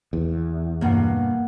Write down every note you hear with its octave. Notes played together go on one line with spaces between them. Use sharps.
E2
G2 B2 A#3 F#5